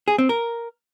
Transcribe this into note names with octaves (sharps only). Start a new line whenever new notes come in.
G#4
C4
A#4